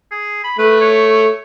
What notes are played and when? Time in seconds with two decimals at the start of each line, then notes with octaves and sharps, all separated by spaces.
0.11 G#4
0.44 B5
0.59 A3 B4
0.81 C#5